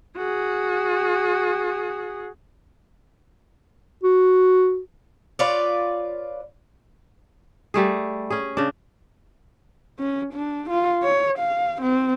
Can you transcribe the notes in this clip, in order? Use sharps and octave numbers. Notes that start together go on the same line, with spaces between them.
F#4 G#4
F#4
F4 B4 C#5 D5
G3 A3 G#4
C#4 G#4
C#3 D4
C#4
D4
F4
C#5
F5
C4